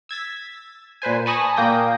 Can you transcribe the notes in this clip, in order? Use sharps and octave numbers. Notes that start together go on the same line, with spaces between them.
E6 G#6 A6 B6
A#2 B4 C5 G#5
G#5 A5 B5 C#6 D#6 A#6
A#2 A#3 G5 D#6 G6 A#6